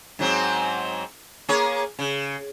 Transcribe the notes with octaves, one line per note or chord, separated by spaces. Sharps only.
G#2 F#3 C4
A#3 G#4 C#5
C#3